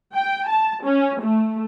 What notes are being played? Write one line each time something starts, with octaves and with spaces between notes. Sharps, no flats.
G5
A5
C#4
A3